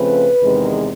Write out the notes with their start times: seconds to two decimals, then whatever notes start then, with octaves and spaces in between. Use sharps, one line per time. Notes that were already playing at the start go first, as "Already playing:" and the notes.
Already playing: C#3 F3 A3 C4 B4
0.42 E2 C3 D#3 G#3